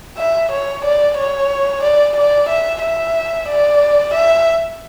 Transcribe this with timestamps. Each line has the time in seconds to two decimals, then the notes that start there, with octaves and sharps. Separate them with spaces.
0.19 E5
0.52 C#5
0.85 D5
1.17 C#5
1.83 D5
2.17 D5
2.49 E5
2.83 E5
3.49 D5
4.14 E5